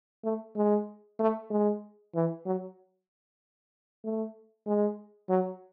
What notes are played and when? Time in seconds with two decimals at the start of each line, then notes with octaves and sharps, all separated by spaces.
0.24 A3
0.56 G#3
1.19 A3
1.50 G#3
2.15 E3
2.46 F#3
4.04 A3
4.66 G#3
5.29 F#3